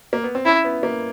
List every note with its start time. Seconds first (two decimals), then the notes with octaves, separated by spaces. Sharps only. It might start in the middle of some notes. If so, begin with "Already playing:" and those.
0.13 A#3
0.24 B3
0.35 C4
0.46 C#4 E4
0.64 B3
0.83 A#3